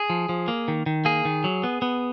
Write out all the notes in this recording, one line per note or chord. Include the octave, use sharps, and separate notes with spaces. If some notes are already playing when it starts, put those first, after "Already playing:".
Already playing: G#4
F3
F3
A#3
D#3
D#3
A#3 G#4
D#3
F#3
B3
B3